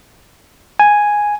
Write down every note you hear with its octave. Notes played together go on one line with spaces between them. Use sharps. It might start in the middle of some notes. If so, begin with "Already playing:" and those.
G#5